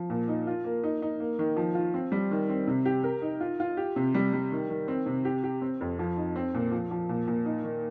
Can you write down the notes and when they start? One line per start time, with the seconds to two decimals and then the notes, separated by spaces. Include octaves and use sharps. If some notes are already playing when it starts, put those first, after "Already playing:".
Already playing: F3
0.10 A#2
0.28 D#4
0.47 F4
0.64 A#3
0.83 D#4
1.02 D#4
1.20 A#3
1.39 D#3
1.57 F3
1.75 F4
1.94 C4
2.12 G3
2.31 D#3
2.49 C4
2.67 C3
2.85 G4
3.03 A#4
3.22 D#4
3.40 F4
3.60 F4
3.77 G4
3.96 C3
4.14 G3
4.33 G3
4.52 D#3
4.69 D#3
4.88 C4
5.06 C3
5.25 G4
5.44 G4
5.62 C4
5.81 F2
5.99 F3
6.17 D#4
6.36 C4
6.54 A#2
6.72 F3
6.91 F3
7.09 A#2
7.27 A#2
7.45 D#4
7.64 D#3